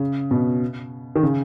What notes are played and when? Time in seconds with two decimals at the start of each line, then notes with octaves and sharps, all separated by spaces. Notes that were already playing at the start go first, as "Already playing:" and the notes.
Already playing: C#3
0.31 B2
1.16 D#3
1.23 C#3